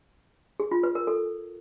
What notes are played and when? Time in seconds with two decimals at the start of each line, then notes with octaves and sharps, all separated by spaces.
0.60 G#4
0.72 F4
0.83 B4
0.95 A#4
1.07 A4